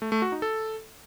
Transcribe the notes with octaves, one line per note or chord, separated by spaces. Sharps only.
A3
A3
F#4
D#4
A4